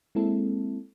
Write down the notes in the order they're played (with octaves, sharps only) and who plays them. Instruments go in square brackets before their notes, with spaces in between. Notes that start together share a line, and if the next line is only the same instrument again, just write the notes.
[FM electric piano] G#3 A#3 C4 E4 A4